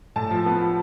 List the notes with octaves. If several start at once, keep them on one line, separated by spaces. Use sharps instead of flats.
A2 A5
F3
B3
F3